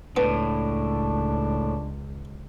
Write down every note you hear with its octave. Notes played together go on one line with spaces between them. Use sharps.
C#2 A2 B3 D4